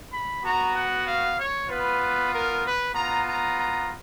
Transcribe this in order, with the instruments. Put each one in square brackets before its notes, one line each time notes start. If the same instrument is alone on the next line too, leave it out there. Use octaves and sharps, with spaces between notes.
[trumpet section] B5
B3 F#4 A#5
F#5
F5
C#5
B3 F4 B4
A#4
B4
B3 F4 A#5
A#5
A#5